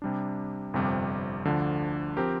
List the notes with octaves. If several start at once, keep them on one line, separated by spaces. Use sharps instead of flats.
C3 G3 D4
G1 F2 C3 G3
D2 D3 F3 D4
F3 C4 G4 A#4